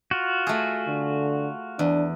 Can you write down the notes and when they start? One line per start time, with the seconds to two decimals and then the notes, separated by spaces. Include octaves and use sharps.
0.11 F4 F#4
0.47 A3 G#4
0.88 D3
1.79 E2 D4